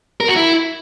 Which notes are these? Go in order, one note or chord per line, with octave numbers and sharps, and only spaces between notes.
A#4
F#4
E4